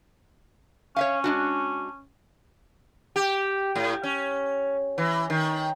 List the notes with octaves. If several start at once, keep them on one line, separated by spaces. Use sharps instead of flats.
C#4 C#5 E5 F5
G#3 D4 F#4
G4
A2
C#4
E3
D#3